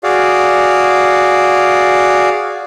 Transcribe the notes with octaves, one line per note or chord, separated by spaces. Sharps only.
F#4 G#4 D5 F5